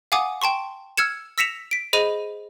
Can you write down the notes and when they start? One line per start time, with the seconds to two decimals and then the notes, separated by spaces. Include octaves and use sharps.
0.12 F5 F#5 G#5 D6 D#6
0.42 G5 A5 C6 C#6
0.97 E6 F6 G#6 C#7 E7
1.38 E6 A#6 B6 C#7 E7 F7
1.71 B6 D7
1.93 G#4 C5 D#5 B5 D#7 F7